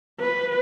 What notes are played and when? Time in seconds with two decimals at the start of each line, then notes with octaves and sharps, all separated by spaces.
0.20 B4